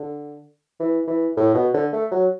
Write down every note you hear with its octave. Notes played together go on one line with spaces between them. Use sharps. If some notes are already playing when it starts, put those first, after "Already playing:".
Already playing: D3
E3
E3
A2
B2
D3
A3
F#3